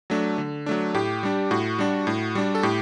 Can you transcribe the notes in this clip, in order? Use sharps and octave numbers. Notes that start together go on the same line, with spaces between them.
F#3 A3 D4
D3
F#3 A3 D4
A2 G4
G3 D4
A2 F#4
G3 D4
A2
G3 D4
A4
A2 G4